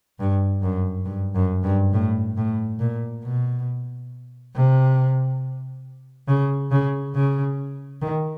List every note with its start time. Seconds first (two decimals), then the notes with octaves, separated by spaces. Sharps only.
0.19 G2
0.63 F#2
1.06 G2
1.36 F#2
1.64 G2
1.93 A2
2.37 A2
2.80 A#2
3.24 B2
4.55 C3
6.28 C#3
6.71 C#3
7.15 C#3
8.02 D#3